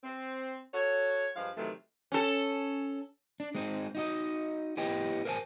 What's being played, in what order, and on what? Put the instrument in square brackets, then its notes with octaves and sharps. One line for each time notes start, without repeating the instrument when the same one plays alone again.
[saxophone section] C4
F#4 A4 C#5
G2 F3 G#3 F5
C3 D#3 E3 F#3 A3
[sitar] C#4 A4
[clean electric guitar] D4
G#3 C4 D#4
D#4 F#4 D#5
B3 E4 G4 D#5 G5
A#4 C5 E5 F#5 G#5 A5